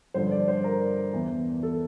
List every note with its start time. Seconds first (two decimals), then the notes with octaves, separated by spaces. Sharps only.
0.14 G2 D3 F3 C5
0.31 D5
0.48 C5
0.64 A#4
1.13 E2 E3
1.63 A4